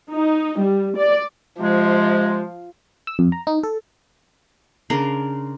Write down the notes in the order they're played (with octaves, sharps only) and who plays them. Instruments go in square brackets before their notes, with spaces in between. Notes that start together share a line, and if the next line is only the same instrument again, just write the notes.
[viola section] D#4
G3
D5
[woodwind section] C3 G#3 [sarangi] F3
[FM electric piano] E6
F2
A#5
D#4
A4
[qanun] C#3 D4 A#4 C6